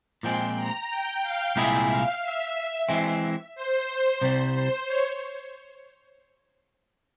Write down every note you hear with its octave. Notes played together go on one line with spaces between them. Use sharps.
A#2 F3 G#3 C4 G5
A#5
G5
F5
C2 A#2 G#3 E4 G#4 E5
F5
E5
E3 G#3 C4
C5
C2 C3 G3 C5
C5
C#5